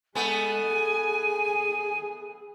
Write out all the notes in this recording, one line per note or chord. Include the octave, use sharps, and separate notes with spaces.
G#3 A3 B3 G#5
G#4